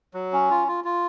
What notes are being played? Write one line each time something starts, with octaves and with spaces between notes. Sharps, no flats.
F#3
C#4
F4
F4
F4